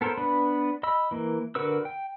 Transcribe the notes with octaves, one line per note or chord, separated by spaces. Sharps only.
B3 A4 A#4 C5
B3 D4 B4
D#5 B5 E6
E3 A#3
D3 F#4 A#4 B4 E6
G5